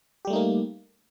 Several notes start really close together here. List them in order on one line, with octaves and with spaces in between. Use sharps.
G4 G3 A3 D#4 A#3